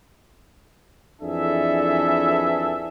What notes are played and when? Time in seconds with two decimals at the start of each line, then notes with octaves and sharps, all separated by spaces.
1.22 F2 E3 D4 G#4 A4 E5